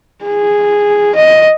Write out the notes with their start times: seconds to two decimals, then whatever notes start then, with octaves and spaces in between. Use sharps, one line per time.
0.25 G#4
1.16 D#5